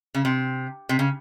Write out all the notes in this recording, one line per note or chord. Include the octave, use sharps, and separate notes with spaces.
C#3
C3
C3
C#3